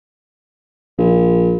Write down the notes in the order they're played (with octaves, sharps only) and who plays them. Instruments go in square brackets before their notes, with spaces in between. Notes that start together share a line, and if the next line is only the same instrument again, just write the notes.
[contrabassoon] A#1